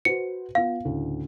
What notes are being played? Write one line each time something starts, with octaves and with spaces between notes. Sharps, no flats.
F#4 B4 C5 C#7
B3 F4 F5
D2 A2 C#3